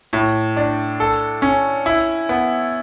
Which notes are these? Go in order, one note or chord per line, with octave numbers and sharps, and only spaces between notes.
A2
D4
A4
C#4
E4
B3